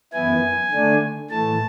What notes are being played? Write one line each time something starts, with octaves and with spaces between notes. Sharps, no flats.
F#2 E3 B3 E4 G#5
D3 A3 D4
A2 E3 A3 A5